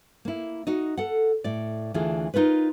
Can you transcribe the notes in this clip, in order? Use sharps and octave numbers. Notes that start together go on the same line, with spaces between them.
A#3 E4
D#4 F#4 D#5
A4 F#5
A2 D5
D2 E3 D4 F4 G#4
D#4 F4 A#4 B4